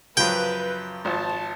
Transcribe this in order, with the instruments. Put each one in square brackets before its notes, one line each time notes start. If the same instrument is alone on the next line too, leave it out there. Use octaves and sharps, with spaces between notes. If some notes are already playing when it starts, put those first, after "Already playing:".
[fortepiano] F#2 C#3 F3 [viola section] B4 [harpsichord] G5
[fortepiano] G#1 F3 [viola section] A5